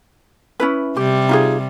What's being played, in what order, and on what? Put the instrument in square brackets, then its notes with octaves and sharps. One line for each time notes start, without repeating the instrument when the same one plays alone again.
[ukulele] C#4 E4 B4
[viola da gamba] C3 G3 [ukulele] G4
[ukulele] D#4 F4 G#4